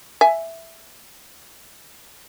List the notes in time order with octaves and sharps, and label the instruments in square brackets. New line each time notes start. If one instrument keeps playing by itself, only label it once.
[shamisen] E5 G#5